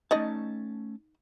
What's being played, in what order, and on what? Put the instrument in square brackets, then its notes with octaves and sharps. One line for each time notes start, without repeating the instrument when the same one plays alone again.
[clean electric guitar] A3 C#4 A5 [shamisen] D#4 D5 D#5